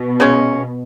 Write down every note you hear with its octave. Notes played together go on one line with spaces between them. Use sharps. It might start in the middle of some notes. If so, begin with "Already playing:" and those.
Already playing: B2
C#3 G#3 C#4